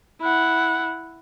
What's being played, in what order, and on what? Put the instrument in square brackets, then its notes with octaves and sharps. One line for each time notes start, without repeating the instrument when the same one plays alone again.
[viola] E4 F#5